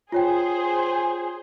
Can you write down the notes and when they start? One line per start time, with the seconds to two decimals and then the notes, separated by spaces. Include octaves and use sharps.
0.12 F4 G#4 C5 C#5 G5